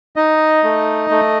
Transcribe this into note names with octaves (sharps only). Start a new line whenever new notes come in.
D#4 D#5
A3
A3